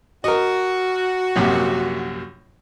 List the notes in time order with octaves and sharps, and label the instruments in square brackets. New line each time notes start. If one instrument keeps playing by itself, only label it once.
[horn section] F#4 [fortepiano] A#4 D#5
[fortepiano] A#1 F#2 C3